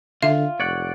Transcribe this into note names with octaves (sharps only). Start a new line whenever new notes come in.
D3 F4 E5
F1 C#5 D5 F#5